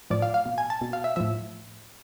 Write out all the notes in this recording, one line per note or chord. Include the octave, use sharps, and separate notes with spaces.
A2 F3 D5
F5
F5
B2
G#5
A5
B2
F5
E5
A2 F3 E5